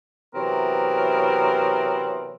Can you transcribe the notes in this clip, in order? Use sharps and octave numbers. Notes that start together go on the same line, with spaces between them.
C3 E3 F#3 B3 C4 A#4